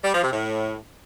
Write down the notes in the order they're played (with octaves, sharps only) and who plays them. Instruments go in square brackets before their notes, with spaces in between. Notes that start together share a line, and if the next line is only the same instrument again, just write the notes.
[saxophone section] G3
F3
C3
A2